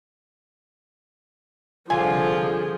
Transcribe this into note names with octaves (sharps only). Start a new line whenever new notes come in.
C2 D3 F3 F4 G#4 F5 G#5